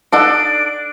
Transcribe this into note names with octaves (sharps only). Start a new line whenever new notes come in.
D4 D#4 A4 F#5 D7